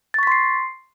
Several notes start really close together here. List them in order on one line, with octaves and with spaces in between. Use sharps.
A6 C#6 B6 C6 C7